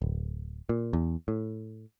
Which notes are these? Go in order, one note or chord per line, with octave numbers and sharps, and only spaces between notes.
D1
A#2
E2
A2